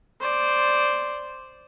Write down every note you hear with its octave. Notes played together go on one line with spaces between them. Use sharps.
C5 D5